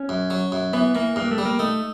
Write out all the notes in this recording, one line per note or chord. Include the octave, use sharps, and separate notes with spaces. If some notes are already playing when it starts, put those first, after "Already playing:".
Already playing: C#4
F#2
F#3
F#2
E3 B3
E3 A#3
G2 A#3
A3
G3
A#3
A3 D#4